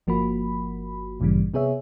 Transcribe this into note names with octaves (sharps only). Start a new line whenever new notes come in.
G1 F3 A#3 F#4 B5
A1 G2 A#2 C#3 E3 G3
C3 B3 G#4 C#5 E5